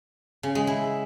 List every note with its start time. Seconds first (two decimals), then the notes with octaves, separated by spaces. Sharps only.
0.43 C#3
0.55 G#3
0.67 E4